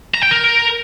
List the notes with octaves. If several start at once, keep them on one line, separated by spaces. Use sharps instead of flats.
A#5
G5
A#4